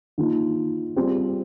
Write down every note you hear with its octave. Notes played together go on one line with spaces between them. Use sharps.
D#3 A#3 F4
G3 C4 F4 G#4